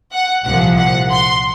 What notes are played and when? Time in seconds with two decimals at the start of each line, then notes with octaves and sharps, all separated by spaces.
0.12 F#5
0.45 C2 A#2 F3 F#5
0.77 F#5
1.10 C6